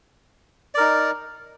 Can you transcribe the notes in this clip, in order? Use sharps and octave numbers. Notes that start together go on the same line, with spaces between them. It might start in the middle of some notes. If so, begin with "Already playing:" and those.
D#4 A#4 D5